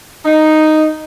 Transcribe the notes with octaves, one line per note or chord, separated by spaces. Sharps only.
D#4